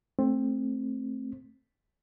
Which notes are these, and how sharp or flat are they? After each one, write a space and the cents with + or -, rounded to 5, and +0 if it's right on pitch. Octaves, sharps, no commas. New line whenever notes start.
A3 +0 C4 +15